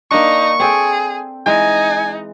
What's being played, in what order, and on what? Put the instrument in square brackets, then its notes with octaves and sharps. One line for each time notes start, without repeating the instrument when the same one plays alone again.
[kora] A#3 D4 [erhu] D#4 [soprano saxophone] C#6
[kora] C4 A4 G5 [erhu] G#4
[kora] E3 G#3 [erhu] D#4 [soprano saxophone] G#5